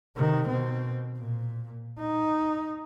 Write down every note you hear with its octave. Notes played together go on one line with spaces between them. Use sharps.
C3 D#3
B2 C4
A#2
D#4